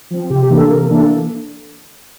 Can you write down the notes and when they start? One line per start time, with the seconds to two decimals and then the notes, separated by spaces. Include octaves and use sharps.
0.11 F3 C4
0.30 C3 G4
0.43 G4
0.50 E3 A#3 D4
0.56 A4
0.69 C3 A#4
0.90 E3 A#3 D4
0.96 A4